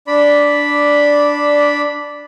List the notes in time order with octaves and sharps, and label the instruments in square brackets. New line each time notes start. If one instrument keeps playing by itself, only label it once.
[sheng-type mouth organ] D4 D5 B5